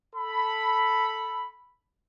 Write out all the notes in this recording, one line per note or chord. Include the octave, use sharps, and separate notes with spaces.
A4 B5